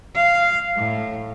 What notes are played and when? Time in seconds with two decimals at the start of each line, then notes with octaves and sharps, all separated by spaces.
0.15 F5
0.76 A2